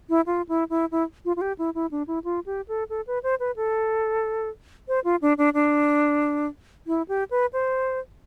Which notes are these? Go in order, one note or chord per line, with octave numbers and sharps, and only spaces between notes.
E4
F4
E4
E4
E4
F4
F4
G4
E4
E4
D4
E4
F4
G4
A4
A4
B4
C5
B4
A4
C5
F4
D4
D4
D4
E4
G4
B4
C5